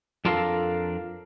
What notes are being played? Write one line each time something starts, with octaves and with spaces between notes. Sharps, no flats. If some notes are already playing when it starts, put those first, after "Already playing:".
F2 D4 F4 A4 A#4 F5